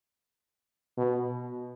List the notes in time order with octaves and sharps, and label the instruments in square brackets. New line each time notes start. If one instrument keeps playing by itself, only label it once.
[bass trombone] B2